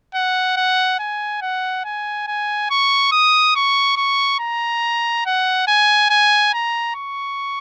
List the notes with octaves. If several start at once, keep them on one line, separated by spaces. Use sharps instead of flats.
F#5
F#5
G#5
F#5
G#5
G#5
C#6
D#6
C#6
C#6
A#5
F#5
G#5
G#5
A#5
C#6